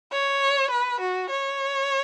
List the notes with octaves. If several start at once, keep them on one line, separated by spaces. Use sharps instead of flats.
C#5
B4
F#4
C#5